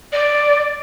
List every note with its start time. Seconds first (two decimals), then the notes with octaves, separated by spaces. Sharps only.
0.13 D5